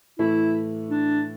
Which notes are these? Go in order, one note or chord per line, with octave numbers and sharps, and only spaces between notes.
A2 E3 A3 E4
D4